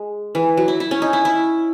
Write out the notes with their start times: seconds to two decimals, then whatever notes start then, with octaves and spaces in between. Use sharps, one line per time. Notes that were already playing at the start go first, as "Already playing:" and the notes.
Already playing: G#3
0.35 E3
0.57 F#3
0.68 E4
0.80 E4
0.91 C#4
1.02 D#4
1.13 E4
1.25 E4